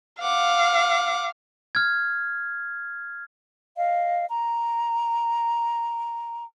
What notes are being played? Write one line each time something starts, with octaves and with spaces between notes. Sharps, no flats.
F5 F#5 D6
F6 G#6
D#5 F5
A#5